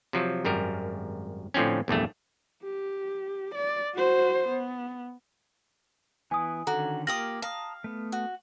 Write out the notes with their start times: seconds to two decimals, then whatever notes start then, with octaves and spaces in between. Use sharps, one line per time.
0.13 C3 F3 F#3
0.45 G#1 F#2 G3 A#4
1.54 A2 D3 F3 C4 C#4
1.88 A#1 E2 G2 A3
2.63 G4
3.54 D5
3.94 F#4 C5
4.48 B3
6.31 E3 B3 E4 G#5 D#6
6.67 D3 D#3 C#4 F#4 A4 A#5
7.07 A#3 F4 G4 A#4 D#6 F6 A#6 F#7
7.42 F5 A5 A#5 D#6
7.84 A3 B3
8.12 F#4